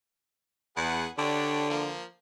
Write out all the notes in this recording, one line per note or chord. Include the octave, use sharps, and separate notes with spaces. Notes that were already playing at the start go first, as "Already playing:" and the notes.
E2 G#4 B4 F#5
D3 D4 G4 C#5
F3 A#3